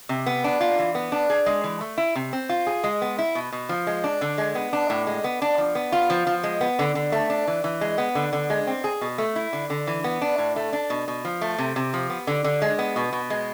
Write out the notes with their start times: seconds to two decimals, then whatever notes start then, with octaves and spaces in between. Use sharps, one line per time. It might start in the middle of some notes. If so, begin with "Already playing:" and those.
0.09 C3
0.26 B3
0.44 D4
0.60 F4
0.78 E3
0.95 B3
1.12 D4
1.30 G#4
1.46 G#3
1.64 E3
1.81 A3
1.97 E4
2.15 C3
2.33 C4
2.49 F4
2.67 G#4
2.84 G#3
3.02 B3
3.18 E4
3.35 B2
3.52 B2
3.69 F3
3.87 G#3
4.04 D4
4.21 D3
4.38 G#3
4.55 B3
4.73 D4
4.90 A2
5.07 G#3
5.24 B3
5.42 D4
5.58 F3
5.75 B3
5.92 F4
6.10 F3
6.27 F3
6.43 G#3
6.61 B3
6.79 D3
6.95 D3
7.12 A3
7.30 D4
7.47 E3
7.64 E3
7.81 G#3
7.98 B3
8.15 D3
8.33 D3
8.50 G#3
8.67 C4
8.84 G#4
9.01 B2
9.18 A3
9.36 E4
9.53 D3
9.70 D3
9.87 E3
10.04 B3
10.21 D4
10.38 A2
10.56 A3
10.73 D4
10.90 B2
11.08 B2
11.25 F3
11.41 A3
11.58 C3
11.76 C3
11.93 F3
12.10 B3
12.27 D3
12.44 D3
12.62 G#3
12.78 B3
12.96 B2
13.13 B2
13.30 G#3